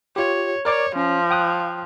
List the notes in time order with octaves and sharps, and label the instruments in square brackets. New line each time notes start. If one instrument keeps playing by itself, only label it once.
[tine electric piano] F4 G4 [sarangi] C#5
[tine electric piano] A#4 D5 D6 [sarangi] C#5
[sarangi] F3 [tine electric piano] C#4
[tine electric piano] G5 D#6 F#6